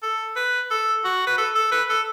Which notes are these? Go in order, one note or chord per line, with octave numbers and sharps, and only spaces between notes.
A4
B4
A4
F#4
B4
A4
A4
B4
A4